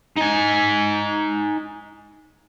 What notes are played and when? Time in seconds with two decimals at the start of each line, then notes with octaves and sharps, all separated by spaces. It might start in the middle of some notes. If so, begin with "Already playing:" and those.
0.17 D#4 G#5